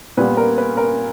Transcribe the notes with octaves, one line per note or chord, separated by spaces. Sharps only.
A#2 G3 B3 B4
A#4
B4
A#4